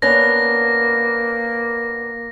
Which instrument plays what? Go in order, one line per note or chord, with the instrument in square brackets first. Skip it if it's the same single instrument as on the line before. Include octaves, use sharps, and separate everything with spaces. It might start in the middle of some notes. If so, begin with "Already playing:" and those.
[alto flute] A#3 [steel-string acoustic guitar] B3 C#4 D4 [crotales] A#6